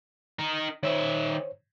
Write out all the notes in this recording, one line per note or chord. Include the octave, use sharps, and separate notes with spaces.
D#4 A#4
D#3 C5 C#5 E5